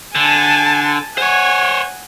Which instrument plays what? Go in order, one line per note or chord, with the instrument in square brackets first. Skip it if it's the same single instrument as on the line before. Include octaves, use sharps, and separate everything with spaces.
[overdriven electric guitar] D3 [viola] G#5 A5
[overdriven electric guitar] C5 C#5 [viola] F#5 G#5